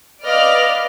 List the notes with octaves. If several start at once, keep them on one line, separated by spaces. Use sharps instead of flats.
B4 D5 D#5 F5 F6